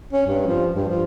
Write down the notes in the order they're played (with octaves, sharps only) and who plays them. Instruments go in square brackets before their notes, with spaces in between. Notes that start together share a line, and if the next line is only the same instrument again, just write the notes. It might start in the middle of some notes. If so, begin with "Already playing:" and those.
[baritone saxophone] C#4
G2
F3
G2
F3